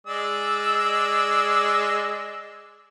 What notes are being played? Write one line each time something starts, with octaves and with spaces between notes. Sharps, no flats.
G#3 D5 E6